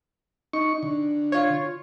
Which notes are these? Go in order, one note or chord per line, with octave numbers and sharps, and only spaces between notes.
D#4 C#6
D3
F4 C#5